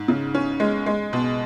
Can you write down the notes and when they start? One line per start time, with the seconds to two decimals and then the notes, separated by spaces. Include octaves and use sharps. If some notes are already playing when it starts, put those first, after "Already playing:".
Already playing: G#2
0.08 C#3
0.35 C#4
0.60 G#3
0.86 G#3
1.13 B2